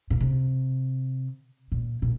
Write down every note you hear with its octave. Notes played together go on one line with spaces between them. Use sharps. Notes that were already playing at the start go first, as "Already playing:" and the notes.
A#2
C3
A#2
A#2